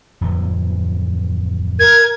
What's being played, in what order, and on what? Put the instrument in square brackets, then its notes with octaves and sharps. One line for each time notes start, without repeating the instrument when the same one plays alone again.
[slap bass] D1 F2 E3
[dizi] A#4 [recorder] G#6